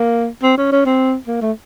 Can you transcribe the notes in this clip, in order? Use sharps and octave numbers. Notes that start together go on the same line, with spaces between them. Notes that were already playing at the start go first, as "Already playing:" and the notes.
Already playing: A#3
C4
C#4
C#4
C4
A#3
A3